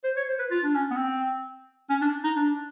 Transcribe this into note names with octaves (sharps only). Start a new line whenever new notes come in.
C5
C#5
C5
B4
F4
D4
C#4
B3
C4
C#4
D4
D#4
D4